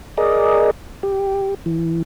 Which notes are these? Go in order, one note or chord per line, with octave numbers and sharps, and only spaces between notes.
G#4 A#4 D5 D#5
G4
E3